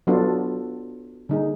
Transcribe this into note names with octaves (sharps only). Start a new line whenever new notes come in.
F#3 B3 D4 F4 A4
D3 G3 A#3 D#4 G#4